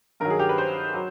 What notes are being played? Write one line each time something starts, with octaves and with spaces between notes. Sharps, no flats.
G2 D#3 F#3 A#4
G#4
G4
B4
C5
F#3